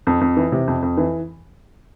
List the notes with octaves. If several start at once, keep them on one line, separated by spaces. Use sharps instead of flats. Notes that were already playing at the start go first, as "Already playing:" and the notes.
F2
F2
E3
C3
F2
F2
E3